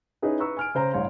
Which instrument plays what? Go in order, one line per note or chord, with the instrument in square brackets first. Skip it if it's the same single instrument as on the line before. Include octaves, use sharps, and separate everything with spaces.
[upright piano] C#4 D#4 E4 G#4 B4
B4 A#5 C#6 E6
G#5 F6 D7
C#3 C5 A#5
A1 G2 C#5 F5 C6